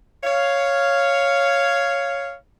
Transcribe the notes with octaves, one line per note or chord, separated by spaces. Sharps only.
C#5 F5